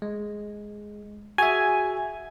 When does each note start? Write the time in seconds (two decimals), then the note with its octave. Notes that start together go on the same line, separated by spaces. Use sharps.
0.02 G#3
1.38 F#4 G#4 E5 G#5